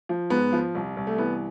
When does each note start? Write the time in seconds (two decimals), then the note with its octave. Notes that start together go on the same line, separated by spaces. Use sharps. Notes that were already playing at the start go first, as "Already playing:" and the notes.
0.09 F3
0.30 G#2 B3
0.53 F3
0.75 C2
0.97 C2
1.07 A3
1.18 E3 B3